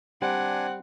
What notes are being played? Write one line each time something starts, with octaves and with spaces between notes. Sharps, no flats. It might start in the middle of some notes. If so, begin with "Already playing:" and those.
G3 C4 D4 F#5 G#5